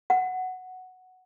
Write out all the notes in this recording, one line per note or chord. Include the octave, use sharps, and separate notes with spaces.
F#5